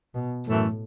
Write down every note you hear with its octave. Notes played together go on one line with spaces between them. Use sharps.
B2
F#2 A2 E3 A3